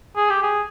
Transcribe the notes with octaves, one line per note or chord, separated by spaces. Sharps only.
G#4
G4
G#4